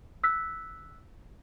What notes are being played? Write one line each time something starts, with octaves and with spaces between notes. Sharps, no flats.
E6 F#6 B6